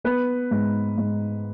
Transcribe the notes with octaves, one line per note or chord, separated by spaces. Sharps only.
B3 B4
G#2
G#2